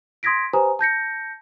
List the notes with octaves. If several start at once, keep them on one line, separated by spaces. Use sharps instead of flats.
C6 D#6 G#6 A#6 B6 D7
G4 B4 C5 G#5 A#5 D#6
A5 G6 A#6 C#7